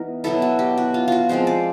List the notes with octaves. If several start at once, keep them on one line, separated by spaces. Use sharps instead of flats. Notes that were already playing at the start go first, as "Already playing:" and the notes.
Already playing: E3 B3 D#4 A#4
B2 F#3 B3 E4 A4
F#4
G4
F#4
F4
F4 F#4
F3 G#3 C4 C5
D5